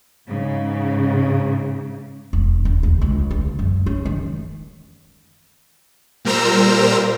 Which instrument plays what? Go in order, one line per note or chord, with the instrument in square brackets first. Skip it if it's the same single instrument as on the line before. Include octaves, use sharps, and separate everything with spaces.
[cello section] G#2 C#3
[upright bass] E1
D#1
D2
C#2
D2
F#2
C#4
D#3
[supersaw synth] A#2 G3 A#4 C5 A#5 E6